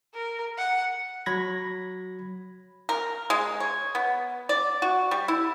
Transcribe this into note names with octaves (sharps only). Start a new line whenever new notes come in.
A#4
F#5
F#3 B5 G#6 A#6
A#4
G#3
C#5
B3
D5
F#4
G3
E4